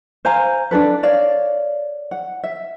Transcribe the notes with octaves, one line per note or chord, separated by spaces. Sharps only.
C5 F5 G#5 A#5
D4 D#4 A4 B4
C#5 D5 F5
F#5
E5